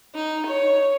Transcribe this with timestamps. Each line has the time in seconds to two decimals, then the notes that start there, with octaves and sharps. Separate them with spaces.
0.15 D#4
0.46 C#5